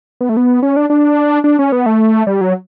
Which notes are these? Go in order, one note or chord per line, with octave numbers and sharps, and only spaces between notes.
B3
A3
B3
C#4
D4
D4
D4
C#4
B3
A3
G3
F#3